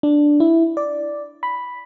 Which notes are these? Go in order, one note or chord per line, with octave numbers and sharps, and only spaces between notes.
D4
E4
D5
B5